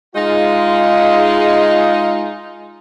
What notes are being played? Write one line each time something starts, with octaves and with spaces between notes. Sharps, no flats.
G#3 D#4 F4